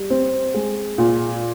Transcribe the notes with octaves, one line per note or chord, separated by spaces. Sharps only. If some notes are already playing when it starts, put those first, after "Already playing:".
Already playing: G3
C4
G#3
A#2